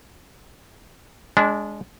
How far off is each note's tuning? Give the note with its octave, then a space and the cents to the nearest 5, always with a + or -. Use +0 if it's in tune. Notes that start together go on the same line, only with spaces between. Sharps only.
G#3 +0 D4 -25